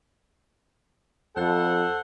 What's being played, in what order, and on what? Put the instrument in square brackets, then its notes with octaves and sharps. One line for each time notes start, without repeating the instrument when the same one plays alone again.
[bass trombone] F2 [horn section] A4 C5 F#5